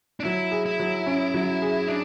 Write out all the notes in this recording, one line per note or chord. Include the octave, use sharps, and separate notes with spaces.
D4
F#3 E4
G#4
E4
F#3
C#4
F#3
G#4
D4